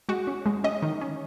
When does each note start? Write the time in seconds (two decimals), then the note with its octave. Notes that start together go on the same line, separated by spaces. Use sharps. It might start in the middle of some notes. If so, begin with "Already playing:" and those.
0.09 G#3 F#4
0.27 C#4
0.46 G#3
0.64 C#4 D#5
0.82 D#3
1.01 C#4